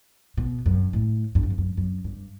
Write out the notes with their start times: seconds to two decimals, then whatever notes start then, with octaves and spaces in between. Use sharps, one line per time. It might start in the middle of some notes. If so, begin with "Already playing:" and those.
0.37 B2
0.66 F#2
0.93 A2
1.35 G2
1.43 F#2
1.50 E2
1.58 F#2
1.77 F#2
2.04 G2